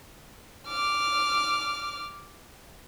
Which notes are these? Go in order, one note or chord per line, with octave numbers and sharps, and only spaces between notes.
D6 F6